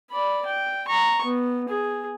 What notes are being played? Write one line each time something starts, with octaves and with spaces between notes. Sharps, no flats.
D5 B5
G5
A#5 C#6
B3
G#4